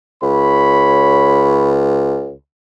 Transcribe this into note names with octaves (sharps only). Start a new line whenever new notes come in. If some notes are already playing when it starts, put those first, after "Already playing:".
C#2 C#5 B5